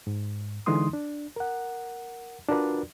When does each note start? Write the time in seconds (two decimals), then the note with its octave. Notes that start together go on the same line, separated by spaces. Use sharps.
0.07 G#2
0.66 D3 E3 G#3 D#4 C6 D#6
0.93 D4
1.36 A#4 F#5
2.48 D4 F4 F#4 A#4 B4 D5